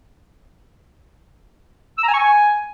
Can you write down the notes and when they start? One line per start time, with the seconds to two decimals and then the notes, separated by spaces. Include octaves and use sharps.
1.98 E6
2.03 A#5
2.08 G#5
2.14 C#6
2.19 G#5